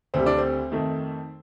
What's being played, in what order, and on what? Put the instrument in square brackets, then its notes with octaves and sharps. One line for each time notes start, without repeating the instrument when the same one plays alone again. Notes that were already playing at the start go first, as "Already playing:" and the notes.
[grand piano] D2 D3 G3 C4
D4
C4
F2 D#3 A3